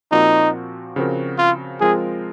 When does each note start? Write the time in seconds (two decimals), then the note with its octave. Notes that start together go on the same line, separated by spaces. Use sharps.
0.12 A#2 F3 C4 D#4 F#4 A#4
0.96 C#3 F3 C4 F#4 A#4
1.39 F4
1.81 F3 G#3 C4 F4 G#4 A#4